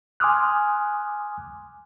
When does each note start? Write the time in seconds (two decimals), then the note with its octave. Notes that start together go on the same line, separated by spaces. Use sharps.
0.20 G#5 C6 D6 D#6 F6 F#6